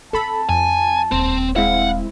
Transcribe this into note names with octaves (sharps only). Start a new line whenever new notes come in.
C4 A4 A5 B5
F2 G#5
D#1 C4
G#3 C4 E4 F5 F#5